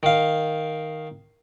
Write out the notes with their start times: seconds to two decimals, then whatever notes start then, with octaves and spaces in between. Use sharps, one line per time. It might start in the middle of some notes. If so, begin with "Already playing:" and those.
0.03 D#3 F5